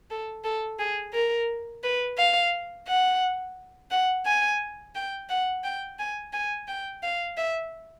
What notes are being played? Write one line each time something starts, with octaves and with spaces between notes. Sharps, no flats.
A4
A4
G#4
A#4
B4
F5
F#5
F#5
G#5
G5
F#5
G5
G#5
G#5
G5
F5
E5